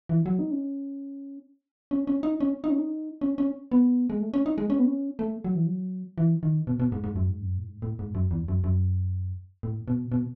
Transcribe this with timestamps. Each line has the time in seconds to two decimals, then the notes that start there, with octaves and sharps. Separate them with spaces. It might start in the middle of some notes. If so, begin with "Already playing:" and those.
0.09 E3
0.26 F#3
0.39 D#4
0.51 C#4
1.91 C#4
2.07 C#4
2.23 D#4
2.40 C#4
2.64 D#4
2.70 C#4
2.78 D#4
3.21 C#4
3.38 C#4
3.72 B3
4.10 G#3
4.21 A3
4.34 C#4
4.46 D#4
4.58 G#3
4.70 C#4
4.78 B3
4.86 C#4
5.19 A3
5.44 F#3
5.55 E3
5.67 F#3
6.18 E3
6.43 D#3
6.67 B2
6.80 B2
6.92 G#2
7.04 G#2
7.16 F#2
7.29 G#2
7.42 F#2
7.58 A2
7.66 G#2
7.82 A2
7.99 G#2
8.15 F#2
8.31 E2
8.48 F#2
8.64 F#2
9.63 A2
9.88 B2
10.12 B2